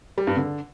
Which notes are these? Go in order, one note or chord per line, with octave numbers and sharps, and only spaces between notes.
G3
G2
D3